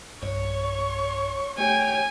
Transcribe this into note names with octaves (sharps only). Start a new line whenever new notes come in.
B1 G2 C#5 C#6
A3 G4 C#5 G5 G#5